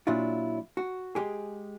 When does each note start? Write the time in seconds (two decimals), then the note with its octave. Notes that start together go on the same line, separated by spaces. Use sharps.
0.07 A#2 F#3 D4 E4 F4
0.77 F#4
1.15 G#3 G4 G#4